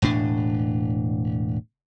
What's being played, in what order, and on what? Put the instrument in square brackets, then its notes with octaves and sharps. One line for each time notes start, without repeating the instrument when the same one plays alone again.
[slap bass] E1 A2 D4